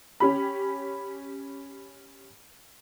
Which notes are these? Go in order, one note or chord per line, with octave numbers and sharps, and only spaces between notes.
C#4 G4 B5